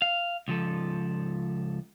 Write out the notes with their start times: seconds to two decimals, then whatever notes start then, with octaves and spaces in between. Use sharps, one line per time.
0.02 F5
0.48 C#2 F3 A4